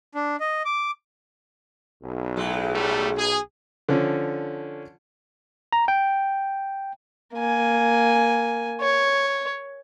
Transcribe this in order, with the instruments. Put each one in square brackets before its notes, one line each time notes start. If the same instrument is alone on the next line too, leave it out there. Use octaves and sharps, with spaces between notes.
[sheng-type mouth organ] D4
D#5
D6
[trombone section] B1
[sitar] A2 F#3 G#3
[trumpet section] G3 A3
G#4
[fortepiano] D3 F3 C#4
[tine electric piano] A#5
G5
[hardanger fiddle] A#3 G#5
C#5